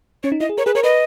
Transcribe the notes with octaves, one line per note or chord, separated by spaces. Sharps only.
C#4 C#5
D#4
E4 D#5
G#4
A#4 C#5
G#4 B4
A#4 C#5
B4 D#5